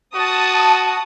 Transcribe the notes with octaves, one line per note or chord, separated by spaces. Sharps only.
F#4 A5 D#6